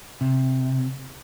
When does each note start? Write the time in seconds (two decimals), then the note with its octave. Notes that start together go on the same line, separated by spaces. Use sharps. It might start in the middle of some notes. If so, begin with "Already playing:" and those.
0.21 C3